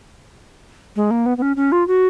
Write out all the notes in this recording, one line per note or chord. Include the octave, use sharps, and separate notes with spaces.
G#3
A#3
B3
B3
C#4
C#4
F4
F#4